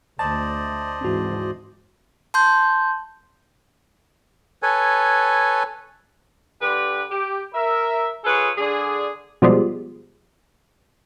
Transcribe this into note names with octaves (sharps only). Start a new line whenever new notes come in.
D2 A3 C5 D5 D#5 A5
G#2 E3 C4 F#4
A5 C6 G6
A4 B4 C#5 G#5
D3 G4 B4
G4
A#4 E5
F4 G#4 A4 B4 C#5
D3 D4 G#4
B2 F3 G3 G#3